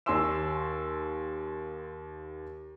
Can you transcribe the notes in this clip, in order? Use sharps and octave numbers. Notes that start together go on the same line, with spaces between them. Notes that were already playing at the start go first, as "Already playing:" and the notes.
D#2 G#5 C6 E6 E7